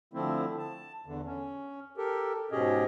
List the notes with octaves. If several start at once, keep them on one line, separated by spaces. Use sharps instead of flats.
D3 F3 A3 C4 E4
A5
E2 D3
C#4
G4 A4 A#4
G#2 B2 C#4 G4 G#4 D#5